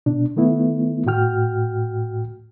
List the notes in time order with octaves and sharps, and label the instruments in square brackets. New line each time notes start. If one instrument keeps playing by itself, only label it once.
[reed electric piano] B2 D4
D#3 A3 B3 E4
A2 F#4 G5 F6